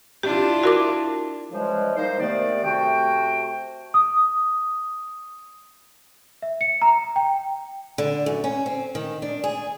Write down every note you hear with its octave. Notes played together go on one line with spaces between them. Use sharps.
D4 E4 F4 G4
F#4 A#4 D6
C#3 E3 F3 G3 G#3
A#3 D#4 C5
D#2 C3 D#3 A3 B3 D5
C3 A3 F#4 G5
D#6
E5
C#7
A#5
G5
D3
F#2
C#4
C4
D#3
D4
G#4